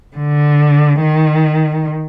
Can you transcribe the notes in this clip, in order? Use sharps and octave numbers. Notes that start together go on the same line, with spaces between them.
D3
D#3